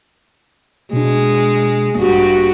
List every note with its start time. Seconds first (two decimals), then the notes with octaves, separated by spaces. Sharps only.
0.93 B2 G#3 D4
1.96 A1 G2 F#4 G4